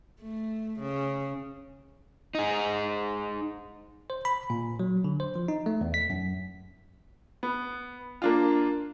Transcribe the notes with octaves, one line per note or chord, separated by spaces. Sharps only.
A3
C#3
D#4 G#4
C5
B5
A#2
F#3
D3
C5
F3
D#4
A3
E2
B6
F#2
B3
A#3 D4 F4